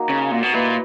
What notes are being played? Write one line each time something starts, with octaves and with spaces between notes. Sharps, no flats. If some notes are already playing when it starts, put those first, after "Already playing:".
Already playing: A#3 D#4 F#4
C#3
A#2
B2
A#2 E4 B4 D#5